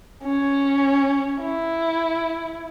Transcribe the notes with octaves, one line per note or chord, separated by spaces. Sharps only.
C#4
E4